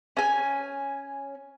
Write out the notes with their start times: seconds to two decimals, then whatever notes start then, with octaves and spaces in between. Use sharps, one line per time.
0.17 C#4 G#5